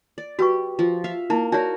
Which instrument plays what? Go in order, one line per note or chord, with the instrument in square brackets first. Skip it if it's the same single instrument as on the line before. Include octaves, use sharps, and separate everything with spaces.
[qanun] D5
[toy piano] F#4 B4 C#6 [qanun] G4
[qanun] F3
E5 F5
[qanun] A#3 [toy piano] D#4 E4
[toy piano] D#4 C#5 D5 [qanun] F#4 A#4